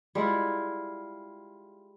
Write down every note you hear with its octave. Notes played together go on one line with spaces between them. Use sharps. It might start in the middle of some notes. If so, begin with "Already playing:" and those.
G3 G#3 E4 F4